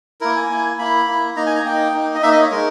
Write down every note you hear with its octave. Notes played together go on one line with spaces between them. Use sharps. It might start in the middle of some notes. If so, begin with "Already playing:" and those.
A#3 E4 A#4
G#5
A#3 E4
A#3 E4 B5
A#3 E4
A#3 D#4 A#5
G#5
A#5
A#3 D#4 G5
A#3 D#4
D#5
A#3 D#4 E5
D#5
C#5
G#3 D#4 A#4